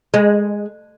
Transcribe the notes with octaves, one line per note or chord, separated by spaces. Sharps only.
G#3